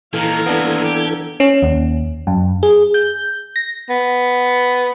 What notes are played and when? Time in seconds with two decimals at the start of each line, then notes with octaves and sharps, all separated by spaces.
0.13 A#2 D#3 E3 A4 F5 A#5 G#6
0.46 D#2 C3 B3 D4
0.84 G4
1.40 C#4
1.62 D#2
2.27 F#2
2.63 G#4
2.94 G6
3.56 A#6
3.89 B3